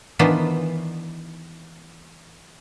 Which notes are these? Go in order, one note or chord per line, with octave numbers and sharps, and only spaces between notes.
D#3 E3 B3 D4 F4 C5